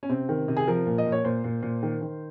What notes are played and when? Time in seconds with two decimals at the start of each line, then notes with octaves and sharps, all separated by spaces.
0.03 C#4
0.09 C3 C4
0.29 D#3
0.48 C3
0.57 G#4
0.67 F3 A#4
0.87 A#2
0.98 D#5
1.06 A#2
1.12 C#5
1.24 A#2 C5
1.44 A#2
1.63 A#2
1.83 D#3
2.02 D#3